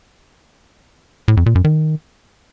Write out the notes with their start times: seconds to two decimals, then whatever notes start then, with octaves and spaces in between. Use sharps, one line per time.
1.28 A2
1.37 F2
1.46 A#2
1.55 F#2
1.65 D#3